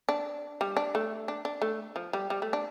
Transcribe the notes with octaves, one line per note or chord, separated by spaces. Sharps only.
D4
G3
D4
A3
D4
D4
A3
F3
G3
G3
A3
D4